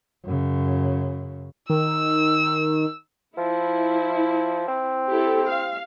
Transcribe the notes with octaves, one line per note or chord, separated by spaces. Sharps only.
F#2 C#3
D#3 E6
F3 E4
C4
E4 G4 A4
F5